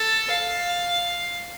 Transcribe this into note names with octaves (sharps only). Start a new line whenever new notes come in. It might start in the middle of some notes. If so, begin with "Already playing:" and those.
Already playing: A4
F5